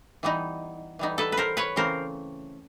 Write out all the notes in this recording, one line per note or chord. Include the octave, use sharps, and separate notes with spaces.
E3 G3 B3 D#4
E3 G3 B3 D#4
A4 B4
B4
A#4 C5
B4 C#5
C#3 E3 A3 C4 A#4 C5